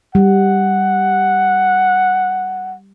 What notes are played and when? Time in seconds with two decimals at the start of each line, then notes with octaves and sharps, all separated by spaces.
0.15 G3 F#5